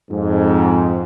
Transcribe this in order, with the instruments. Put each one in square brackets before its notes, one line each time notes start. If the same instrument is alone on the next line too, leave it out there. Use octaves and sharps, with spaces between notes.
[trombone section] F2 G#2